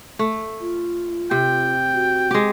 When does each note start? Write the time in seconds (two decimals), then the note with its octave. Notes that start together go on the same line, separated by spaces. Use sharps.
0.19 A3
0.61 F4
1.31 C3 G5
1.94 F#4
2.31 G#3 G4